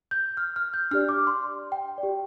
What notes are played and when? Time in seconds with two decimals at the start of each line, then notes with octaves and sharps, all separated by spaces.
0.11 G6
0.37 F6
0.56 F6
0.74 G6
0.91 D4 G4 D5 F6
1.09 D6
1.27 C6
1.72 G5
1.98 D5
2.03 G4